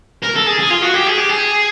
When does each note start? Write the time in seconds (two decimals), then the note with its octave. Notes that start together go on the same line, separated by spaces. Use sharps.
0.23 A#4
0.36 A4
0.47 G#4
0.59 G#4
0.71 F4
0.82 F#4
0.94 G4
1.07 G#4
1.18 G4
1.29 G#4